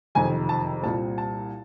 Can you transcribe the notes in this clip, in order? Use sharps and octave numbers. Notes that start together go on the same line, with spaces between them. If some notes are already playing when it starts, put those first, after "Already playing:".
F#1 F2 C3 D#3 G#5
A5
C2 A#2 G3 C4 A5
A5